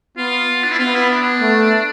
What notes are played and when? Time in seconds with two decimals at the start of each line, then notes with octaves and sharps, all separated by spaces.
0.17 B3 F4
0.64 D4
0.72 E4
0.79 B3 F4
0.95 E4
1.10 D4
1.41 A3